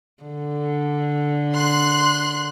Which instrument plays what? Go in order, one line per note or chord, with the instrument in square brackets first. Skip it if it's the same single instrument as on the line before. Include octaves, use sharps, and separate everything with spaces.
[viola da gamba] D3
[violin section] C6 F#6